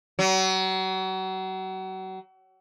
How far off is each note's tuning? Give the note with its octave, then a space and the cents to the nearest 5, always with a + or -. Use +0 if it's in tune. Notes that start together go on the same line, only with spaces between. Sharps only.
F#3 +35